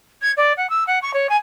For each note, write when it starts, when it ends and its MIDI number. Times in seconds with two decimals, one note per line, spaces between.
0.22 0.31 92
0.37 0.53 74
0.57 0.69 78
0.69 0.84 88
0.87 0.99 78
1.02 1.13 85
1.13 1.27 73
1.29 1.36 80